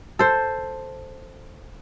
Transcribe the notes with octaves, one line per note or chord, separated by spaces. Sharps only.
A4 C5